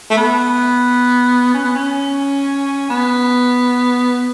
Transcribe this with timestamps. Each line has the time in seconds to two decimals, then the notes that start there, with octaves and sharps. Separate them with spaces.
0.10 A3
0.17 B3
1.54 C#4
1.64 B3
1.75 C#4
2.90 B3